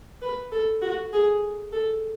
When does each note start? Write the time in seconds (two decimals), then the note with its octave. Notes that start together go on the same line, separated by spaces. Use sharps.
0.22 B4
0.52 A4
0.82 F#4
1.13 G#4
1.72 A4